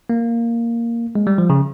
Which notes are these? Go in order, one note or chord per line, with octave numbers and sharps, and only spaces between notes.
A#3
G#3
G3
F3
C#3